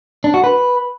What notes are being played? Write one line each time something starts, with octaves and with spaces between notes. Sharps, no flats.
D4
F#4
B4